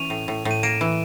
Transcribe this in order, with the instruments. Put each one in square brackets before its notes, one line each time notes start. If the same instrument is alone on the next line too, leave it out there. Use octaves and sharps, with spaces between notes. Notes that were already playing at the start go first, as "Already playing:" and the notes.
Already playing: [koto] E3 C#4 [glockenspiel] D#7 F7
[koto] A2
A2
A2
[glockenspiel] D#7
[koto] A#3 [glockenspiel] D7 E7
[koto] E3